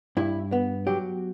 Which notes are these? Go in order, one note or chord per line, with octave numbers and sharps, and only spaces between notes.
G2 E4
B3
F#3 G4